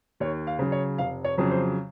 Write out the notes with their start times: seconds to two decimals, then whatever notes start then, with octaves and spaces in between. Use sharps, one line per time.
0.20 D#2 C#5
0.47 F5
0.59 C#3 F#3
0.72 C#5
0.98 F1 F5
1.24 C#5
1.38 F2 C#3 F#3
1.51 C5